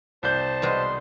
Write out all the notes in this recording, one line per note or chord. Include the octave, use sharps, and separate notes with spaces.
C2 C5 D5 A5 G6
B2 G3 G#3 C6